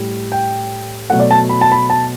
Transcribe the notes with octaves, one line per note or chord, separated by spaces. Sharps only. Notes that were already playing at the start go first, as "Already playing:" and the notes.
Already playing: A2 G3
G5
B2 F#3 A3 F#5
D5
A5
B5
A5
B5
A5